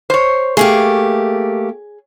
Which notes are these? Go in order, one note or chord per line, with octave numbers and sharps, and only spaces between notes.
C5 C#5
A3 A#3 G4 G#4